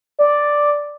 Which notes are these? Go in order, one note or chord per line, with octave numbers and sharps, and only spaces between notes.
D5